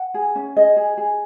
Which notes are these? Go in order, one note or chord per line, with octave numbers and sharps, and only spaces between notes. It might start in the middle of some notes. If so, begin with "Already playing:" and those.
Already playing: F#5
G#4
C#4
G#4 D#5
G#4
G#4